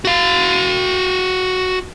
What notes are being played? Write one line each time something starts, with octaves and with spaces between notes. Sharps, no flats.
F#4 F5